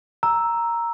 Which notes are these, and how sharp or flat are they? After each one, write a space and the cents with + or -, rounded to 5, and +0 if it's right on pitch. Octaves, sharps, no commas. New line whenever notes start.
A#5 +0 E6 +0